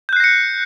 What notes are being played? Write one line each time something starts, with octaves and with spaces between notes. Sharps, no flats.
F#6 G6 A#6 C7 C#7